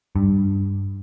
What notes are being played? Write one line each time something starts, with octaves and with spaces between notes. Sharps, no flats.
G2